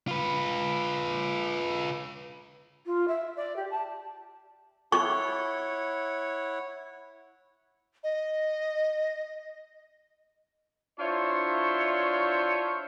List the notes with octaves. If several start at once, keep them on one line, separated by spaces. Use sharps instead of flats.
F4 B4
F4
E5
D5
G4
A5
E4 C#5 F#5 C#6
D#5
D4 E4 F4 C5 C#5 E5